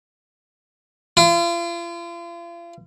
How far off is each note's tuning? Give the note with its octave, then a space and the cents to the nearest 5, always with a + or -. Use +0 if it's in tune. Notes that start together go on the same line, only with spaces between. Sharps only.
F4 -40